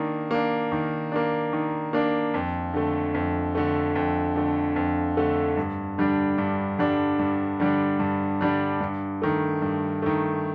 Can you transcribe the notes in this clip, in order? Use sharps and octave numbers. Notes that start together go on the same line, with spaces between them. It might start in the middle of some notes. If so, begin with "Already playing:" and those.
Already playing: D#3 A#3 D4
A#3 D4
D#3
A#3 D4
D#3
A#3 D4
F2
D3 A3
F2
D3 A3
F2
D3 A3
F2
D3 A3
G2
D3 G3 D4
G2
D3 G3 D4
G2
D3 G3 D4
G2
D3 G3 D4
G2
D#3 A3
G2
D#3 A3